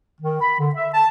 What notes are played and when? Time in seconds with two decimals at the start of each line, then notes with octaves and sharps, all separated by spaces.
0.21 D#3
0.41 B5
0.58 D3
0.75 E5
0.94 A5